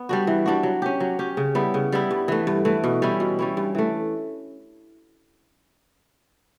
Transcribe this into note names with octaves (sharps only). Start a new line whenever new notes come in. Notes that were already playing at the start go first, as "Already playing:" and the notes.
Already playing: B3
G3 D4 F#4
E3
G3 D4 F#4
F#3
C#4 G4
F#3
C#4 G4
C#3
G3 B3 E4
C#3
G3 B3 E4
G2
E3 A3
G2
E3 A3
B2
G3 C#4 E4
B2
G3 C#4 E4
G2
E3 A3